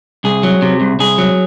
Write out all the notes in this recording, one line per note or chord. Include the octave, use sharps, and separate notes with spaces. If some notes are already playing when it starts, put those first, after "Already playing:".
C2 G#4
F#3
C3
C2
C2 G#4
F#3